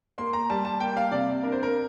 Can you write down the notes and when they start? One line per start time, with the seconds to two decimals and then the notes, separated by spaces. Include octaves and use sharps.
0.18 A#3 C6
0.33 A#5
0.50 G3 A5
0.65 A5
0.80 A#3 G5
0.97 F5
1.11 C3 D5
1.43 D4 A#4
1.52 C5
1.63 A#4